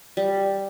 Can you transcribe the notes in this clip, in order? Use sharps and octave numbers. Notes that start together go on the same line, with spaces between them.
G3